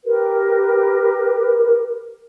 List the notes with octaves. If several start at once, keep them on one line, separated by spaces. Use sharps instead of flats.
G4 A#4 B4